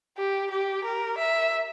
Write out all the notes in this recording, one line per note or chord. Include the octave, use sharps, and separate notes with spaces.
G4
G4
A#4
E5